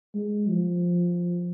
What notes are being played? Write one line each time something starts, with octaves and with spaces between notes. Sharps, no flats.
G#3
F3